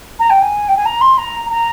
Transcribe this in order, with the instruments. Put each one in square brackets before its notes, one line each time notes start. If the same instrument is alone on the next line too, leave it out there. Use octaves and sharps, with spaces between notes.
[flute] A#5
G5
G#5
G5
G#5
A#5
C6
A#5
A#5